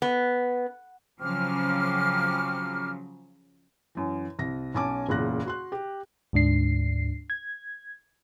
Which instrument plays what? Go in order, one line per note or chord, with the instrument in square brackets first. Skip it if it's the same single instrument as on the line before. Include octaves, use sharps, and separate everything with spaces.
[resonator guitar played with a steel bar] B3
[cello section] C#3 F3 F#3 [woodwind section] C4 D6 F6
[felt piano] F#2 E3
C2 A#6
B1 C#4 G#5 A5 D6
F#1 E2 A#2 C#3 F#6 A#6
F#4 C6 F#6
G4
[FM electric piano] D2 G#2 D4 C7
G#6